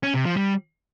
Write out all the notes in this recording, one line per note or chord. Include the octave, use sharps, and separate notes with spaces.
C#4
C3
F3
G3